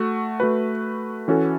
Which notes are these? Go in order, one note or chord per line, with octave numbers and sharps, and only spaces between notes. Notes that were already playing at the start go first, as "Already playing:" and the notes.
Already playing: A3 F#4
A3 F#4 B4
E3 C#4 F#4 A4